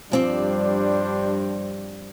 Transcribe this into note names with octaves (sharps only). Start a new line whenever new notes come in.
G2 F3 G3 C4 D4 C5 D5